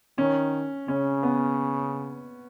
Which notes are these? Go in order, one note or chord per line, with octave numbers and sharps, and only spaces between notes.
D#3 C#4
C#3 C#4
B3